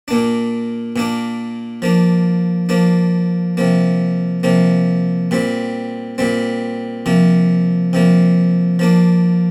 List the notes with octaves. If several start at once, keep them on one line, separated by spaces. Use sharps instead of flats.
A#2 A#3 D4
A#2 A#3 D4
F3 A#3 D4
F3 A#3 D4
C3 F3 A#3
C3 F3 A#3
A#2 G3 C4
A#2 G3 C4
C3 F3 A#3
C3 F3 A#3
F3 A#3 D4